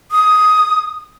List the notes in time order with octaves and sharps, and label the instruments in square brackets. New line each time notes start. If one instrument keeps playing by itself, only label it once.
[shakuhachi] D#6